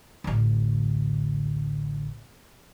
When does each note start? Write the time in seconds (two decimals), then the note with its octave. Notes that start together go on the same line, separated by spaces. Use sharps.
0.24 A1 D2